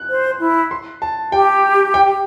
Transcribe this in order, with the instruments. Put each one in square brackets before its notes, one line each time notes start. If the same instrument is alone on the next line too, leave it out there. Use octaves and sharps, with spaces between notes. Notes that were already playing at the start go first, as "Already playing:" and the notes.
Already playing: [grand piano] F#6
[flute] C5
E4
[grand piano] C6
A5
[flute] G4 [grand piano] G5
[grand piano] G5